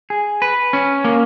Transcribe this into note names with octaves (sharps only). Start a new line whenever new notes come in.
G#4
B4
C#4
A#3